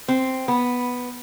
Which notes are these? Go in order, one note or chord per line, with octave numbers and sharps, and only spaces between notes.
C4
B3